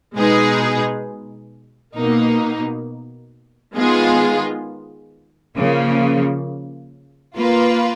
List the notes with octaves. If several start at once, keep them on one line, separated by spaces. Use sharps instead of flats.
B2 G#3 D#4 G#4 B4
B2 A#3 D#4
D#3 G#3 B3 F4 G#4
C#3 F3 A#3
A#3 F4 B4